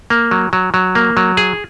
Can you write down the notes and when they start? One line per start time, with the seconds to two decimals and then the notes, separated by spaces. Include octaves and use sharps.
0.10 A#3
0.31 F#3
0.53 F#3
0.74 F#3
0.95 A#3
1.17 F#3
1.37 G#4